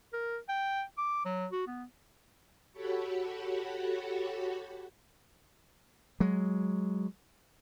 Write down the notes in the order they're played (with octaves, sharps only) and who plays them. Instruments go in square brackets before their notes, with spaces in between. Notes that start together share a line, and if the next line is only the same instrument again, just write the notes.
[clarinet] A#4
G5
D6
F#3
F#4
B3
[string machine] F#4 G4 A4 C#5 F#5 B5
[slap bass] F#3 G#3